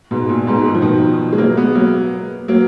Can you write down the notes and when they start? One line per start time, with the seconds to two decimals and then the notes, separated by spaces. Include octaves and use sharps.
0.11 G#2 B2
0.29 A#2
0.47 G#2 B2
0.65 D#3
0.75 F3
0.82 B2 D#3
1.32 G#3
1.38 F#3 A#3
1.57 G#3 B3
1.75 F#3 A#3
2.48 F#3 A#3